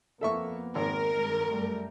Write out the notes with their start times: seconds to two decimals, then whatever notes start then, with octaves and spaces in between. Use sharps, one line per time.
0.21 F2 A#3 B3 A4 E5 C#6
0.75 G#1 A#4
1.13 G2 D#3 G#3
1.48 F#2 G3 A3